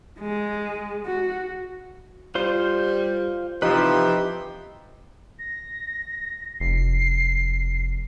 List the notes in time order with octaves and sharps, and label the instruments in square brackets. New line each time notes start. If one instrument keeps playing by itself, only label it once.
[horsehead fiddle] G#3
F#4
[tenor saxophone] G3 [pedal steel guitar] F4 C5 C6
[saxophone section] C3 E3 F3 [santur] D#4 [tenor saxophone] G4 [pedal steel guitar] B4 E5
[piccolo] A#6
[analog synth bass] F1 [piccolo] C7